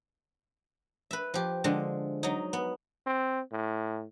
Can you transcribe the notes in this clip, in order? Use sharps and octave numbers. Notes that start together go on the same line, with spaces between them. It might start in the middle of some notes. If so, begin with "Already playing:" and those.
B4 E5
F3 G4
D3 F3 G#3
F#3 D#4
B3
C4
A2